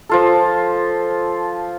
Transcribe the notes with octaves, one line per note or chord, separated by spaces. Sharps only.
F3 F4 A4